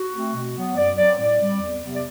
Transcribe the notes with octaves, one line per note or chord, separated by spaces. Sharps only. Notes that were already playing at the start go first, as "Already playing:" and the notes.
Already playing: F#4
A3 C4
B2
F#3 B3
F#2 D5
F#3 C4 D5
A2 D5
G3 C4
E2
C3 F#3 B3
D5